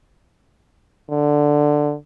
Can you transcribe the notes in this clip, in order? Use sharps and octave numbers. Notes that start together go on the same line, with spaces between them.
D3